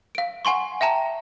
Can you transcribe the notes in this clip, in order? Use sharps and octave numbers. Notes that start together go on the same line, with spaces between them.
F5 D7
F#5 G#5 C6 C#6
E5 G5 A5 A#5